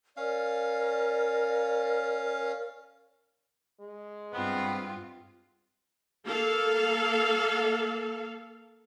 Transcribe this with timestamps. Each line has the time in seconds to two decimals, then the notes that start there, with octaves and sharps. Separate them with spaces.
0.17 C#4 A#4 D5 F5
3.81 G#3
4.33 G2 B3 C4 F4
6.26 A#3 A4 F5